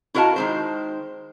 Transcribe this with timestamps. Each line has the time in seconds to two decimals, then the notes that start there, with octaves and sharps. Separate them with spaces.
0.14 E4 F#4 A#4 D#5 F5 A5
0.36 D#3 G#3 C5